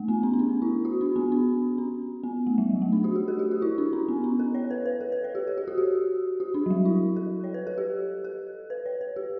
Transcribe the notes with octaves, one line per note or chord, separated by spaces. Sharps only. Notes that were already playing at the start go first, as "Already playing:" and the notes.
Already playing: A3
B3
C#4
C#4
D4
E4
F#4
D4
B3
D4
C#4
B3
A3
G3
F#3
A3
D4
F#4
G4
A4
G4
F#4
E4
D4
C#4
B3
C#4
A4
C#5
B4
B4
A4
B4
C#5
G4
A4
G4
F#4
G4
F#4
D4
F#3
G3
E4
A4
C#5
B4
A4
G4
A4
B4
C#5
B4
G4